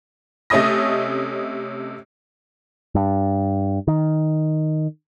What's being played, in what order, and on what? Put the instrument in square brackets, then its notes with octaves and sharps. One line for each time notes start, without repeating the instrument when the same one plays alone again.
[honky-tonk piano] C3 A3 C#4 D#5 D#6 A#6
[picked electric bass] G2
D#3